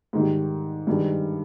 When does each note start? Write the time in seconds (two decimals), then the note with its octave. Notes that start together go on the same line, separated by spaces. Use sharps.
0.13 G#2 D#3 G3
0.87 G2 D#3 G#3